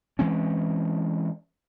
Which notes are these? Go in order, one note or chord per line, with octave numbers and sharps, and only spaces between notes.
E3 G#3 C4 C#4